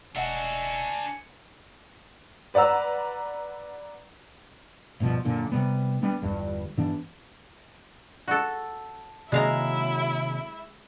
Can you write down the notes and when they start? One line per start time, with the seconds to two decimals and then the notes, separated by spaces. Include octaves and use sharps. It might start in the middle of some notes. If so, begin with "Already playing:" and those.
0.15 E1 D4 F#4 D#5 E5 F#5 G#5
2.54 B4 D5 F#5 A#5 E6
5.00 D1 G2 B2 F3
5.25 F#2 A#2 D3
5.52 C3 G3 B3
6.01 G3 B3 D4
6.22 G1 E2 G2 G3
6.77 G2 E3 B3 D4
8.28 F#4 A4
9.32 C3 D#3 F#3 G#3 A#3 E4 F5 A#5